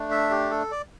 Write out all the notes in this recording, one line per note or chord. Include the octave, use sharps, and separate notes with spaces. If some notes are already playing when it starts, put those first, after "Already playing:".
Already playing: A3 D4
E5
G4
A4
D5